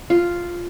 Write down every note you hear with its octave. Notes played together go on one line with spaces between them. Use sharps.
F4